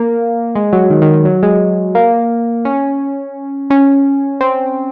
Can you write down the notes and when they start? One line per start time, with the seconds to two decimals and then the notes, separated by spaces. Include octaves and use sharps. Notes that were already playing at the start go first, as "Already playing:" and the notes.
Already playing: A#3
0.55 G#3
0.73 F#3
0.90 D#3
1.02 D#3
1.13 D#3
1.25 F#3
1.43 G#3
1.95 A#3
2.65 C#4
3.70 C#4
4.41 C4